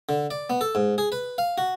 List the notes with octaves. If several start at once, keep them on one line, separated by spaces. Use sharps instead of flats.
D3
D5
B3
A4
G#2
G#4
B4
F5
F#4